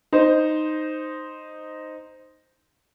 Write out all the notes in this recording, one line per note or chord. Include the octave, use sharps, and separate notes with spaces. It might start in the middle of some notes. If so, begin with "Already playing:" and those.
D#4 C5